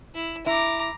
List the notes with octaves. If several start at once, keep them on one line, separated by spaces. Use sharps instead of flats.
E4
E4 A#5 D6